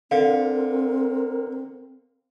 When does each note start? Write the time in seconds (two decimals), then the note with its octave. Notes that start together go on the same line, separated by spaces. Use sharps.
0.11 D3 C4 A#4 F5